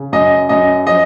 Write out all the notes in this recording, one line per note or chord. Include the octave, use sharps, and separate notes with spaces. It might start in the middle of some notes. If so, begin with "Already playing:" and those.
Already playing: C#3
F#2 D#5
F#2 D#5
F3 D#5